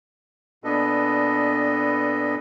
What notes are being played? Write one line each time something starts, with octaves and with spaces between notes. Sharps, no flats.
A#2 B3 D4 A4 B4 D#5